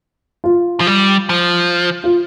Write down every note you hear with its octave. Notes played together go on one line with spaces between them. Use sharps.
F4
F3
G3
F3
F4